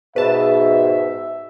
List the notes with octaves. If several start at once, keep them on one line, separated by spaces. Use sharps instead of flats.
G#2 B2 B4 E5 A5